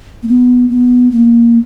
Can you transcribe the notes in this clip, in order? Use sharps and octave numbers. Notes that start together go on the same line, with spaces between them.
A#3
B3
B3
A#3